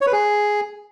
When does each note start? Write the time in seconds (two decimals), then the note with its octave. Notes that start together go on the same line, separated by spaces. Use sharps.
0.01 C#5
0.07 B4
0.13 G#4